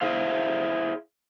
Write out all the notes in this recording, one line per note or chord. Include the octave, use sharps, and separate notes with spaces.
E4 G#4 C5 F5